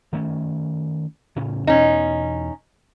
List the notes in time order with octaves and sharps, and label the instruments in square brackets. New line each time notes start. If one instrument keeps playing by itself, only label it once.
[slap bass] D#3 A3 C#4
A2 C#3 C#4
[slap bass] E2 B2 [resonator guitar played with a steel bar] C#4 D#4